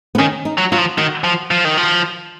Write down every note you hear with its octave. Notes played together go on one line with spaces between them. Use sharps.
B3
D#3 C#4
D#4
F#3
F#3 F4
F3
D#3 F#4
F3
F3
D#3
F3